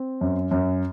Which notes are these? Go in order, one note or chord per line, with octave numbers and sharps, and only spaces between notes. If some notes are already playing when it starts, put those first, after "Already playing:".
Already playing: C4
F#2
F#2